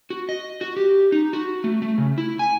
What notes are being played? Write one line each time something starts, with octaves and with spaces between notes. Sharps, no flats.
F#4
D#5
F#4
G4
D#4
F#4
A3
A3
C#3
E4
G#5